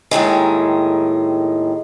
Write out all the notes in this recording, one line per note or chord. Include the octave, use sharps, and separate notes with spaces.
D#2 A2 D#3 G#3